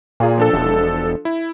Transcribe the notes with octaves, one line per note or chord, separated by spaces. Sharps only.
A#2 A#3 F4 G#4
F3 D4 A4
E1
E4